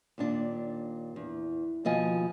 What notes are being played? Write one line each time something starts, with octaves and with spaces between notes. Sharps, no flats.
D#2 A#2 D4
E2
D#2 B2 F3 D#5 G#5